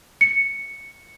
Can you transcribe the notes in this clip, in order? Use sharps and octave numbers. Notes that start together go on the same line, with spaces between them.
C#7